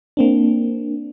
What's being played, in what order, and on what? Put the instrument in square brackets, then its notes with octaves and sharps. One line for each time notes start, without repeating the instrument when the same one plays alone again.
[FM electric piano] A#3 C4 D4